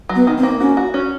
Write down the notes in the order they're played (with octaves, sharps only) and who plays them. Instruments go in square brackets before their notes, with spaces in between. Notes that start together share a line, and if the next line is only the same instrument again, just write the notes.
[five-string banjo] F#3
[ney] B3
[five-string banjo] D#3
[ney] C4
[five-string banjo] A#3
[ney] C#4 [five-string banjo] F#4
[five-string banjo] F#4
C#4